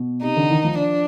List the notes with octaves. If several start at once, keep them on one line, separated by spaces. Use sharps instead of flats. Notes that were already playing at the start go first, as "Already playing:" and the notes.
Already playing: B2
C3 D#4
D3
D#3
F3
D4